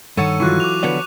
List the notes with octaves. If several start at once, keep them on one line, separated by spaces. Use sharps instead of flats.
G2 D#3 A4 C#5 F#5 C#6 D#7
E3 F#3 F4 C#6 F#6
D6 F7
D3 F3 B3 B4 C#5 D5